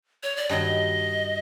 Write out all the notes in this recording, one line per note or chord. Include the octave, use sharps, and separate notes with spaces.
C#5
D5
G2 D#3 F#3 D#5